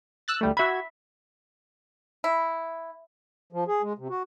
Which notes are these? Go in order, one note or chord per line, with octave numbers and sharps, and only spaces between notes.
E6 F#6 A6
D2 G3 A3
F#4 E5 B5 G#6
E4
F3
G#4
G#3
C3
F#4